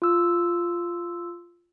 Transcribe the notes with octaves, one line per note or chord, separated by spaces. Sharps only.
F4 E6